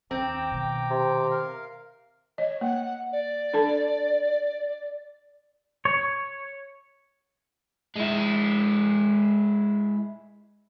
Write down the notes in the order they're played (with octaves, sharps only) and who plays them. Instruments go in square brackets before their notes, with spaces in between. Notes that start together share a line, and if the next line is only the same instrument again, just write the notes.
[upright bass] D#2 D#3 [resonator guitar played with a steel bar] C4 [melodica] G5 A#5 D6
[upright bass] B2 D#3
[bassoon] C3
[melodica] A#4 F5
[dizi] C#5 [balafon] D#5
[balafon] A#3 [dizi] F#5
[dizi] D5
[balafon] D4 A4 A5
[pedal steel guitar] C#5
[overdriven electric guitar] G#3 E4